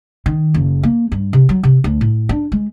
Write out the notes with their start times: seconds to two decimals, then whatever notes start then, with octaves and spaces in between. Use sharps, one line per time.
0.26 D#3
0.54 F#1
0.83 A#3
1.12 G2
1.33 C3
1.49 F#3
1.63 C3
1.84 D2
2.01 A2
2.29 D4
2.52 G#3